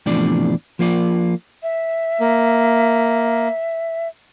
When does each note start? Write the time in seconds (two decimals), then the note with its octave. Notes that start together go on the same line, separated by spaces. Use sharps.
0.06 E2 A2 C3 F3 D4 D5
0.79 F3 A#3 F4 D5
1.63 E5
2.20 A#3